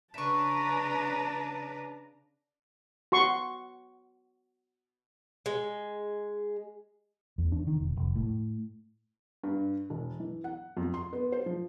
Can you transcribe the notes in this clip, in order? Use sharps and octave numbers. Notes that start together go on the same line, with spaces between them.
C#3 D4 B4 E5 A5 A#5 C#6
F#4 C6 C#6
G#3
E2
D4
D#3
E1
F1
A2
G2
E1
E3
F#5
F2
C6
B3
C5
F3